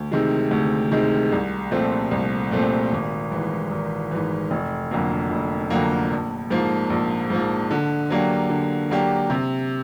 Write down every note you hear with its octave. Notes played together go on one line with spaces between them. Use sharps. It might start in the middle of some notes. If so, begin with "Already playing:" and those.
Already playing: D2
C3 D#3 G#3
D2
C3 D#3 G#3
C2
A#2 F3 A3 C4
C2
A#2 F3 A3 C4
G#1
G#2 E3
G#1
G#2 E3
F1
F2 D3 F#3 A#3
F1
F2 D3 F#3 A#3
A#1
G#2 F3 A#3
A#1
G#2 F3 A#3
D3
F#3 A#3 D4 G4
D3
F#3 A#3 D4 G4
C3